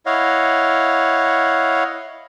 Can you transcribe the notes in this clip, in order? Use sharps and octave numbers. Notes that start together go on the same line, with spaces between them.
E4 C#5 D#5 F5 F#5